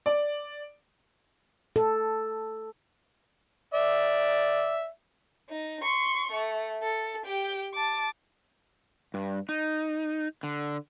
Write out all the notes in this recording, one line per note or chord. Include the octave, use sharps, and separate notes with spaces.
D5
A4
D5 E5
D#4
C6 C#6
A3
A4
G4 G5
A5 D6
G2
D#4
D3